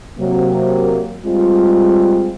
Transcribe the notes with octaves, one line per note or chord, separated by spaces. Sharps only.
C3 F#3 A#3
G3 G#3 C4 F4